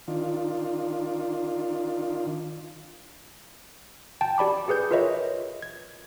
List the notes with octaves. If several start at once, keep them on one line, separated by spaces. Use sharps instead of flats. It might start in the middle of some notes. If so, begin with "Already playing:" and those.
D#3 D4 F4
G5 A5
G4 D5 B5 D6
G4 G#4 B4 G6
F4 A#4 B4 C#5 D#5 E5
G#6